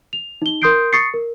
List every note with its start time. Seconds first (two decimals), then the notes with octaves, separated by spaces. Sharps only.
0.13 F7
0.42 D#4 G7
0.62 A#4 C6 D#6 G6 C7 D7
0.92 C#6 D#6 A6 C7 C#7
1.14 A#4